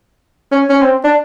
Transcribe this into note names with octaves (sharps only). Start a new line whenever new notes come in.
C#4
C#4
C4
D4